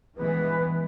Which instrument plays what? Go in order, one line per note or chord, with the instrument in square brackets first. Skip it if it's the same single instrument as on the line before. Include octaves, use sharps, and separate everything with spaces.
[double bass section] G2 E3 G#3 B3 [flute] B4